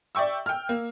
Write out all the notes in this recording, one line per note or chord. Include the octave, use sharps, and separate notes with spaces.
D5 E5 G5 C#6 E6
G5 F6
A#3